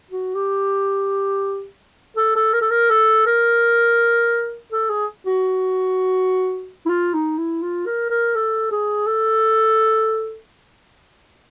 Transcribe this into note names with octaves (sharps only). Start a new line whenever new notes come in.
F#4
G4
A4
A4
A#4
A4
A#4
A4
A#4
A4
G#4
F#4
E4
F4
D#4
E4
F4
A#4
A#4
A4
G#4
A4